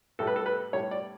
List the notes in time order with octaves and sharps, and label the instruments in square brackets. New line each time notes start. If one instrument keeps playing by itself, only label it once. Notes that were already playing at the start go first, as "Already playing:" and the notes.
[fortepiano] A2 G3 A4
B4
A4
B4
A2 G3 C#5
D5